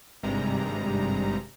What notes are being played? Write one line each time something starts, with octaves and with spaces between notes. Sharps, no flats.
G#1 G2 C3 G3 G#3 A#5